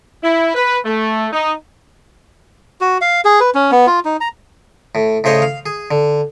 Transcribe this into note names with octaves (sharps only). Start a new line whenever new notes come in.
E4
B4
A3
D#4
F#4
F5
G#4
B4
C#4
B3
F4
D#4
A#5
A2
A2 C#3 C5 C#5 D#5
F5
G#4
D3